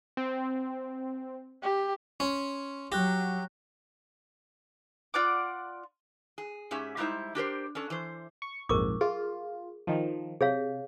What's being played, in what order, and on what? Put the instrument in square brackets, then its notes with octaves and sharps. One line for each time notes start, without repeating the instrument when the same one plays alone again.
[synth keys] C4
[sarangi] G4
[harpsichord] C#4 [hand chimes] C6
[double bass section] F#3 [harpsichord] G4 [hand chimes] C#6 F#6 A#6
[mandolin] F4 D5 F#5 D6
[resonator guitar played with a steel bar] G#4
G#2 C#4 G4 G#4 E5
G3 G#3 D#4 E4 C5 E5
D4 G4 A#4 C5
C#4 D4 A4
E3 C5
[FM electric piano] C#6
[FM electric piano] A#1 F2 G#2 [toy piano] A#4 C#6 D6
[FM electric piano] F4 [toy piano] G#4
[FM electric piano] D#3 F3
[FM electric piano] C3 [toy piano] G#4 C#5 F5